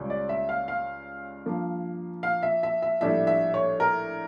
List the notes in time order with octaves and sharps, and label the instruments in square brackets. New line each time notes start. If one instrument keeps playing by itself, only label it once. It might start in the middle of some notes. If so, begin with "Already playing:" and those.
Already playing: [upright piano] C#2 C#3 G3 C#4
D5
E5
F5
F5
G2 F3 A#3
F5
E5
E5
E5
A#1 A2 G3 D4 E5
E5
C#5
A#4